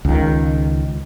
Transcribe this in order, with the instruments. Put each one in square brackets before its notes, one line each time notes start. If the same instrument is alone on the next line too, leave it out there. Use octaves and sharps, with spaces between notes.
[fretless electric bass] C#2 D#3